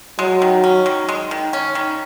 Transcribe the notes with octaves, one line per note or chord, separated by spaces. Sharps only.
F#3 G#3
D#3
C#4
D#3
G#3
D#3
C#4
D#3